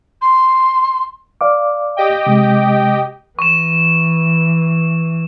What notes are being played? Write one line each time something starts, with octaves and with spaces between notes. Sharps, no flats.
C6
D5 F5 D6
G4 D#5 G5
C3 G#3
E3 C#6 E7